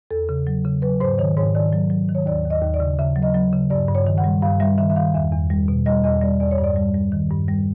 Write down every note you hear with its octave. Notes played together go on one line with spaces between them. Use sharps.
E2 A4
C#3
F#3
C#3
F#3 B4
G#2 C5
D#3 C#5
G#2 C#5
D#3 D5
F#3
F#3
D#3
C#5
D#2 D5
D#2
D#5
D#2
D5
C#3
C#3 E5
F#3
D#5
F#3
C#3
G2 D5
G2
C#5
D#3
F#5
G3
G2 F5
G3 E5
D#3 E5
E5
D#3 F5
E2 E5
E2
G3
B2
G3 D#5
E2 D#5
G3 D5
E2 D5
C#5
G2
D5
G3
G3
D#3
G2
G3